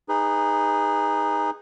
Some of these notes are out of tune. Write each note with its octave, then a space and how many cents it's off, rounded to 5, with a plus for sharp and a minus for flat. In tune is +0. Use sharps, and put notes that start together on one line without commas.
D#4 +0 G#4 -20 B4 +10